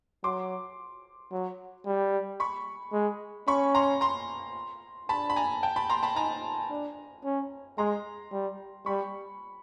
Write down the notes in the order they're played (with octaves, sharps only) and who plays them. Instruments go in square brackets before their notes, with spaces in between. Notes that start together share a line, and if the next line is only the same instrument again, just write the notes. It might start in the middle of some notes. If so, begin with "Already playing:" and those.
[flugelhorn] F#3 [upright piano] C6 D6
[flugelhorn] F#3
G3
[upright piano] B5 C#6
[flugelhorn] G#3
[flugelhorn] C#4 [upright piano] B5 C#6
[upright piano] A#5 C6
A#5 C6
[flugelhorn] D4 [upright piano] A5 B5
[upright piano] B5
G#5 A#5
G5 A5
A5 B5
A#5 C6
A5 B5
[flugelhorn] D#4 [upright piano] G#5 A#5
[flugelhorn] D4
C#4
[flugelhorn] G#3 [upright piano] A#5 C6
[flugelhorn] G3
[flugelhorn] G3 [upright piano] B5 C#6